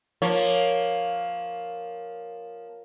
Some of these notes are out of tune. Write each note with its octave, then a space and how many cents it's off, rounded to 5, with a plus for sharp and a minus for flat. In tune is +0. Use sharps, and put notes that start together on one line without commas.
F3 +5 A#3 +0 C#5 +0